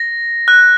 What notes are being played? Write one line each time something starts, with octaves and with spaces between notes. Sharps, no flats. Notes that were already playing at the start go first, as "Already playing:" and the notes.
Already playing: A#6
F#6